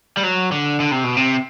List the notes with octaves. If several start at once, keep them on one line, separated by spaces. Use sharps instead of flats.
G3
F#3
D3
D3
C3
B2
C3